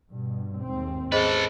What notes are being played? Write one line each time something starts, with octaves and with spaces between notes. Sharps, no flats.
G2 B2
D#2 G#2 C4
G#4 A4 B4 C5 D#5